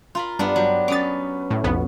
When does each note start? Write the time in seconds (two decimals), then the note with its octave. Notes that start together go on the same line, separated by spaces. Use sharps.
0.15 F4 A#4 B5
0.39 G2 B3 D4
0.56 F#3 G4
0.88 C#4 B4 D6 D#6 A6
1.51 A2
1.64 B1 F2 B3